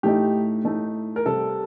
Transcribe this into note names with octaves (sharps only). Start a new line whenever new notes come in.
A2 A3 D#4 G4
A2 A3 D#4
A#4
C3 G3 C4 A4